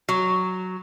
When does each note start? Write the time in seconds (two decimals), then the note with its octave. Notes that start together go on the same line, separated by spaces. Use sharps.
0.09 F#3